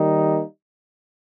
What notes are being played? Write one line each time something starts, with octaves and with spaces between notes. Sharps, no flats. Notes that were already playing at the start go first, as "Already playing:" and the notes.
Already playing: D#3 G3 A#3 D#4